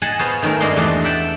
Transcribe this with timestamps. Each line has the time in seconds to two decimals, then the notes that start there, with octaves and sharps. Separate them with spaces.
0.02 G#4 D#5 F#5 G#5 A5
0.19 B3 F4 G#4 C5 C#5
0.42 D#3 A3 C#4 A#4
0.60 G2 G#3 A#3 D4 D#5 C6
0.76 E2 A3 D4 D#5 C6
1.04 E5 F#5 G5 A5